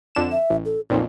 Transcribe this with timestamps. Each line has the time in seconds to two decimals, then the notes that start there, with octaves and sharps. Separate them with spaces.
0.15 F2 D3 E7
0.31 E5
0.50 A1
0.65 A4
0.90 B1 F2 A#2 D#4